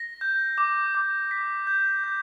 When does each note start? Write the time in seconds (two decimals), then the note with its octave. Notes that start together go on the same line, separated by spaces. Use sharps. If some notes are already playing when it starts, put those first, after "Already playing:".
Already playing: A#6
0.21 G6
0.58 D6
0.95 D6
1.31 B6
1.67 G6
2.04 G6